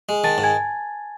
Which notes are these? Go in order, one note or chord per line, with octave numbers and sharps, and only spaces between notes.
G#3
D#3 A5 A6
G#2
G#5 G#6